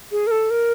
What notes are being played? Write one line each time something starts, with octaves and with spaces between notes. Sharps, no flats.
G#4
A#4
A4
A#4